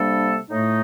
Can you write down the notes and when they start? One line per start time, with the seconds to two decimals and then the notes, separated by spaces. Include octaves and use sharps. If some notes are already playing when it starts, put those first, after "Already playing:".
Already playing: C3 G3 A#3 D4 A4
0.50 A2 A3 D#4